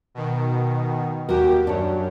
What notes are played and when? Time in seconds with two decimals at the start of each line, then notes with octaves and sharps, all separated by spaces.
0.15 B2 D#3
1.29 D#2 F#4 G4 A#4
1.67 F#2 D4 C#5